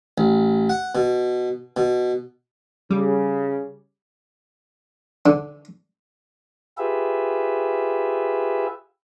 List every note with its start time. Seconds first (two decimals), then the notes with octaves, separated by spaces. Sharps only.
0.18 A1
0.70 F#5
0.95 B2
1.77 B2
2.91 C#3 G3
5.26 D3
6.78 F4 G4 G#4 B4 E5